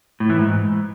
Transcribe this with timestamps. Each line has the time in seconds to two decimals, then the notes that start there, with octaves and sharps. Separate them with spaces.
0.20 A2
0.29 E3
0.39 G#2